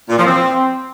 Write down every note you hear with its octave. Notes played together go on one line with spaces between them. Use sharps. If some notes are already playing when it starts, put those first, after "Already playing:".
A#2
F3
C4